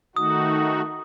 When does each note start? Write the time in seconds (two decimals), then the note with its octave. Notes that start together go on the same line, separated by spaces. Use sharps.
0.16 D#3 A3 D#4 F#4 D#6